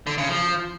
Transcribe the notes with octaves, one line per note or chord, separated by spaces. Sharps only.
D3
C#3
F3